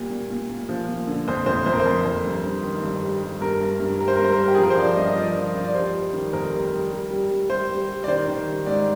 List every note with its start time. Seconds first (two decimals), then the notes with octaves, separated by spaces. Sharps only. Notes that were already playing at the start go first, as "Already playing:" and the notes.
Already playing: A#2 G3
0.10 A#2
0.30 A#2
0.50 A#2
0.69 F3
0.88 A#2
1.07 D3
1.28 F2 C5
1.46 F2 C5
1.66 F2 C5
1.73 A#4
1.80 C5
1.86 F2
2.05 F2
2.25 G2
2.44 G2
2.63 D#3
2.82 G2
3.03 G3
3.22 G3
3.41 G2 A#4
3.61 G2
3.80 G2
3.99 G3 A#4
4.08 C5
4.16 A#4
4.19 G2 C5
4.32 A#4
4.38 G3
4.48 G4
4.54 G#4
4.58 F3
4.63 A#4
4.70 C5
4.77 F3 D5
4.97 G2 D#5
5.08 D#5
5.16 F3 D5
5.36 F3
5.55 F3
5.64 D5
5.75 G3 C5
5.95 G3
6.13 D#3
6.33 F2 A#4
6.53 G3
6.72 G3
6.91 G3
7.11 G3
7.31 G3
7.49 G3 C5
7.70 G3
7.89 G3
8.04 D5
8.08 D#3 C5
8.27 D#3
8.47 G3
8.66 G#2 D5